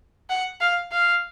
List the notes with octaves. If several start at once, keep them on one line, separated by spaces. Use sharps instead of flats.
F#5
F5
F5